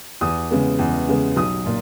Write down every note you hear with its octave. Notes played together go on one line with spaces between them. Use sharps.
E2 D#6
C#3 G#3 B3
E2
C#3 G#3 B3
B1 D#6
A#2